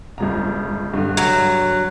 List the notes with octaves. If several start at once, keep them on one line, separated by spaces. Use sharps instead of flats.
G1 C#2 A#5
G2 D3
F#3